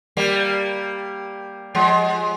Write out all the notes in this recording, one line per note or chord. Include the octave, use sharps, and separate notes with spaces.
G3 A#3
F3 G#3